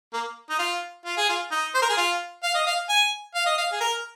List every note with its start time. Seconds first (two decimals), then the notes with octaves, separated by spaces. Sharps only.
0.13 A#3
0.50 D#4
0.59 F4
1.05 F4
1.17 G#4
1.29 F4
1.52 D#4
1.75 C5
1.82 A#4
1.90 G#4
1.97 F4
2.43 F5
2.55 D#5
2.67 F5
2.89 G#5
3.35 F5
3.46 D#5
3.58 F5
3.72 G#4
3.80 A#4